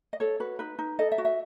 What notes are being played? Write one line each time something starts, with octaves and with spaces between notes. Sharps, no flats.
D#5
A4 C#5
F#4 B4
D#4 B4
D#4
A4 D#5
E5
F#4
E5